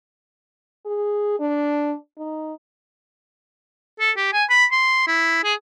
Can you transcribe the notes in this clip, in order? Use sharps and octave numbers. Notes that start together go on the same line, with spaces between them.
G#4
D4
D#4
A4
G4
G#5
B5
C6
E4
G#4